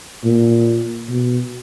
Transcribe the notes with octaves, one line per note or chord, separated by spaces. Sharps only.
A#2
B2